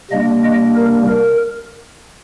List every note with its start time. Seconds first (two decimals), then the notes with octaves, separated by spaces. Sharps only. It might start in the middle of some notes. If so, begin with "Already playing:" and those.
0.11 C3 G3 A#3 D4 D#5
0.43 D#5
0.76 A#4
1.08 A#4